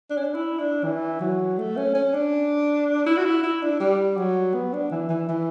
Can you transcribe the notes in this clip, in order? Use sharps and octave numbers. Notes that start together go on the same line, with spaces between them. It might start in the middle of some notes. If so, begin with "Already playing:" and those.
D4
C#4
D4
E4
D4
E3
F#3
A3
C#4
C#4
D4
E4
F#4
E4
E4
D4
G3
F#3
B3
D4
E3
E3
E3